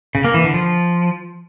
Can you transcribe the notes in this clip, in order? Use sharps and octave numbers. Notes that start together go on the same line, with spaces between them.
C#3
A#3
E3
D3
F3